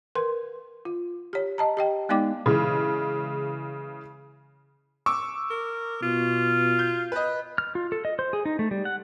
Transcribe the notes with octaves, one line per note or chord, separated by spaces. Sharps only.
A#4 B4 C6
F4
G4 C#5
D#5 A5 A#5
G4 D#5 G5
G#3 B3 D#4 D5 G5 D6
C#3 E3 G#3
C#6 D6 E6
A#4
B2 F4
G6
B4 D#5
F6
F4
A4
D#5
C5
G#4
D#4
A3
G3
F#5